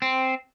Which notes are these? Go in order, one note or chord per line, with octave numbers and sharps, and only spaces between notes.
C4